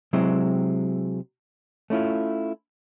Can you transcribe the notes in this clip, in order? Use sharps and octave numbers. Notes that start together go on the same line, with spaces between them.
C3 F#3 G#3 C4 E4
A3 C#4 E4 F4